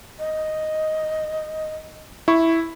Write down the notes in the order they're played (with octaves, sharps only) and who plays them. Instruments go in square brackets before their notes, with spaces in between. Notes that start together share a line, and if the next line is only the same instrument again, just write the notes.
[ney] D#5
[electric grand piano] E4 C#6